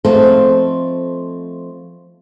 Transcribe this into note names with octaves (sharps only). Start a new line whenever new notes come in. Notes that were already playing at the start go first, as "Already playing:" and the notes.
F3 A3 C4 D#4 A4 C5